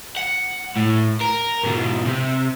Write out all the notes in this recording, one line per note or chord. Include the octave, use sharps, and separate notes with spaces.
F#5
A2
A#4
G#2 B2
C3